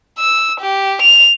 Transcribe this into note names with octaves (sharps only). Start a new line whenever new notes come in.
E6
G4
F7